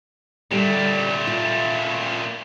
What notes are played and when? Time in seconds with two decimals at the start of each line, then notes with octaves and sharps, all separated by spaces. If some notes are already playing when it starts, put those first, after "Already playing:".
0.51 A#2 D3 G3 A3
1.27 F4